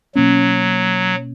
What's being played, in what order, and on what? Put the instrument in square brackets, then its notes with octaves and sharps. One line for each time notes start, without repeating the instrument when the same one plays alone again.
[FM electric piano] B2 A#3 C#4 [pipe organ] F#3